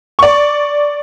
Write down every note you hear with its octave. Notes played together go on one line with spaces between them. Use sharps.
D5 C#6